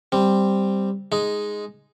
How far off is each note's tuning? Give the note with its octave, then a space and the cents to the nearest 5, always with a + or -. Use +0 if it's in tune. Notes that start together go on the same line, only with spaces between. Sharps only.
G3 +0 C4 +0
G#3 +0 D#4 +0